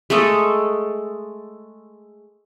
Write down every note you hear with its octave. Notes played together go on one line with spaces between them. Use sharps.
G#3 A3 A4 D#5